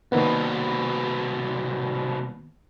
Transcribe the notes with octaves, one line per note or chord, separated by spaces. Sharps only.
C2 B2 D#3 A#3 B3